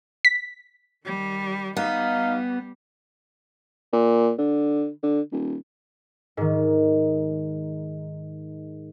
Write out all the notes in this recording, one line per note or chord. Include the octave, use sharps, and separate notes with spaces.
B6
D#3 G3
G3 B3 D#4 F5
A#2
D3
D3
D#1
G#2 D#3